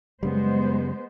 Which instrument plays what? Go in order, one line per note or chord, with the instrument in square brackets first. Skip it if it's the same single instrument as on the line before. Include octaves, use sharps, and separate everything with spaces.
[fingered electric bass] F#2 C#3 G3 [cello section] G#3 B3 C5